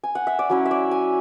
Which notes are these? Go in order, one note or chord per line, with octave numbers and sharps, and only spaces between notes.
G#5
F#5
E5
D5
F#3 C#4 E4 C#5
E5
D5
G#5